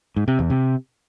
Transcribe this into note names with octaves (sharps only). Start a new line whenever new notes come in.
G#2
C3
E2
C3